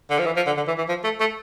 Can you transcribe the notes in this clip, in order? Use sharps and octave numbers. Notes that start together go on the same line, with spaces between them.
D3
F3
E3
F3
D3
D3
E3
E3
F3
A3
A3